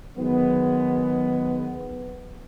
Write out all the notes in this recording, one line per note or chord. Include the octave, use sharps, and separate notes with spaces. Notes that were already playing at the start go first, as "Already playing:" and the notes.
D#3 F#3 G#3 B3